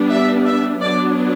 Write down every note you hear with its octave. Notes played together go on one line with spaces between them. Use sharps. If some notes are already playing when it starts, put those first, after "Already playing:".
Already playing: G3 B3 D4
E5
E5
F#3 B3 D4 D5